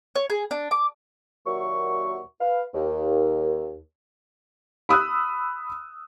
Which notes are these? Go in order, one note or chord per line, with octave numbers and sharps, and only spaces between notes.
C#5
G#4
D4
D6
D#2 A#2 F#3 F#4 E5 C#6
B4 F5
D#2
B5 D#6 E6 F#6